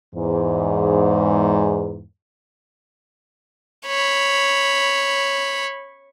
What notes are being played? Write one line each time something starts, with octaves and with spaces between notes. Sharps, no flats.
E2 G#2
C#5 B5